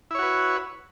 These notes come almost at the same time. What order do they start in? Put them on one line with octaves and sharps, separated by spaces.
E4 C#5 F#4 B4